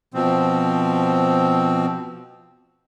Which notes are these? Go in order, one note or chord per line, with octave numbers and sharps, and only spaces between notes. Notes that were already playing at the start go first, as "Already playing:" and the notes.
B2 F3 C4